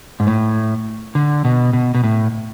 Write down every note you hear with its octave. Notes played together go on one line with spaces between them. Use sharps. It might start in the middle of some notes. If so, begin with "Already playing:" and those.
G#2
A2
D3
B2
B2
B2
A2